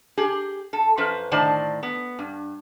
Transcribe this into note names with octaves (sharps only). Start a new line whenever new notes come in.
G4 G#4
A4
F#2 F3 B4 C5
A2 D3 D#3 C5 D5 A5
B3
G2